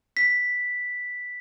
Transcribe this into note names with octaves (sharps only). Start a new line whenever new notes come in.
B6